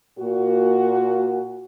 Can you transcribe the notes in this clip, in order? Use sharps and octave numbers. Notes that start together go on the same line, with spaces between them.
A#2 F#4